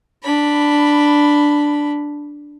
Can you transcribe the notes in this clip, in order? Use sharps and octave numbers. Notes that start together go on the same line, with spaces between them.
D4 B5